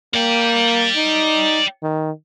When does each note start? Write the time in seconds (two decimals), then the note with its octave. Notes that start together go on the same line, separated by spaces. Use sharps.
0.14 A#3 D5 G5
0.96 D#4
1.83 D#3